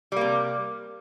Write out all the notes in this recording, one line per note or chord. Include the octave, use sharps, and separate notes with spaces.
C3 G3 A#3